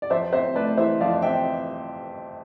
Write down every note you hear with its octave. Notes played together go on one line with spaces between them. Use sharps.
D5
F2 C5 E5
C4 C5 E5
A3 B4 D5
E3 C5 E5
F2 D5 F5
C4 E5 G5